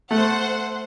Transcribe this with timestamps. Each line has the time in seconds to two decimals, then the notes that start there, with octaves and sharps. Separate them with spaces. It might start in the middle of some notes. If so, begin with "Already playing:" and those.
0.11 A3 C5 F#5